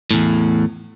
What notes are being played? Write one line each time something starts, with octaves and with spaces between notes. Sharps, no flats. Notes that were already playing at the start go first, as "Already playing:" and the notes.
E2 A2